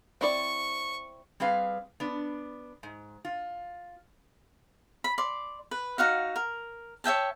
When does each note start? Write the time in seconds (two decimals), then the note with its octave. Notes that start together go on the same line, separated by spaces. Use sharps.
0.21 C4 E4 D5 C#6
1.40 G3 C4 G#4 B4 F5
2.00 B3 D4
2.83 G#2
3.25 F4
5.04 B5
5.18 D5 C6
5.71 B4
5.98 D#4 F#4 F5 F#5
6.36 A#4
7.04 C#5 E5 G5 A5